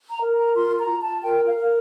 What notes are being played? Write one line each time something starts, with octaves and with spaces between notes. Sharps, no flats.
A#5
A#4
A#5
F4 C6
A#5
F4
A5
A#4 G5
F5
A#4